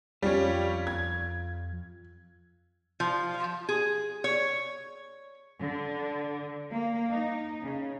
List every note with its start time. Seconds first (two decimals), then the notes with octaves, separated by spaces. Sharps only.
0.22 F2 G3 C#4 F4 F5
0.87 G#6
3.00 F3
3.69 G#4
4.24 C#5
5.61 D3
6.73 A#3
7.12 D#4
7.63 C#3